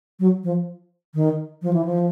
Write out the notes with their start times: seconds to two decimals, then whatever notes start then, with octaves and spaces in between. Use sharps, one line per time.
0.20 F#3
0.44 F3
1.14 D#3
1.62 F3
1.73 E3
1.85 F3